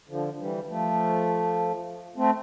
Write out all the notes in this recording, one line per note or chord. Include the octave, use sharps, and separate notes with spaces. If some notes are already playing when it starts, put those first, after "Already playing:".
D3 F3
E3 G3
F3 A3
A3 C4